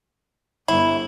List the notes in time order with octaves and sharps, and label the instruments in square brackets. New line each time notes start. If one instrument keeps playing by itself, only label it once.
[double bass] G1 [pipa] E4